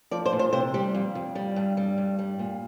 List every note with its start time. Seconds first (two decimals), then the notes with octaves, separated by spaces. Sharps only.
0.11 F3 D5
0.26 C5
0.33 A#2
0.39 C5
0.53 C3 C5
0.74 G3 G4
0.95 F2
1.15 F2
1.35 G3
1.56 G2
1.77 G3
1.98 G2
2.19 G3
2.39 A#2